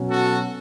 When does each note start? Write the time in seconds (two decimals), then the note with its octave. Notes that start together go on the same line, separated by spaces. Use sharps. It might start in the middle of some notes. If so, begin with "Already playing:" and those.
Already playing: B2 F#3 C#4
0.10 F#4 A4